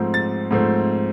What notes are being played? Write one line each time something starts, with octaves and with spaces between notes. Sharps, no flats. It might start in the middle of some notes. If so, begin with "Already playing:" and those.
Already playing: G#2 F3 A3 C4
A6
G#2 F3 A3 C4